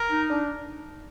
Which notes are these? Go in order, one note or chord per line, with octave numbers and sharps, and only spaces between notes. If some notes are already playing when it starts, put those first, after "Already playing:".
Already playing: A#4
D#4
D4